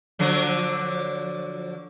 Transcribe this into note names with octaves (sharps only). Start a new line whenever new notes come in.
D3 F3 F#3